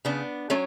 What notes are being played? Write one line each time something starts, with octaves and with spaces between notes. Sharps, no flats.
C#3 B3 D4
F#3 A3 C#4